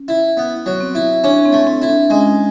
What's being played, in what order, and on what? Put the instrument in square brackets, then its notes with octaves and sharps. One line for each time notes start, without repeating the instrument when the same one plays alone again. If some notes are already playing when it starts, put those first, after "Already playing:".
Already playing: [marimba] C#4
[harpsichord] E4
B3
F#3
[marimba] C4
[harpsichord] E4
[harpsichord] C#4 [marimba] D4
[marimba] C4
[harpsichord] A3
[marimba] C4
[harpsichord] E4
[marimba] D4
[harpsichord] G#3 [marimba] C#4